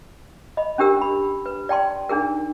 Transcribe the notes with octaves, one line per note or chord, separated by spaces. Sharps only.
D#5 B5
C#4 D4 G4 A#4 E6
B5
B4
D5 G5 A5 C6
D4 D#4 G#4 A#4